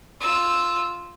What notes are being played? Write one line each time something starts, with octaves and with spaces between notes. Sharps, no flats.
F4 E6